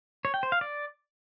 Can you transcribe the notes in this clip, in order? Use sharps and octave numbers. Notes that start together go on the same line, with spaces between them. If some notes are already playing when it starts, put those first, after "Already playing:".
C#5
G5
C5
F5
D5